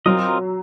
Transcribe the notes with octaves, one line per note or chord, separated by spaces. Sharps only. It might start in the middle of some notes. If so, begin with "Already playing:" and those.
F#3 C4 F4 A#4 D#5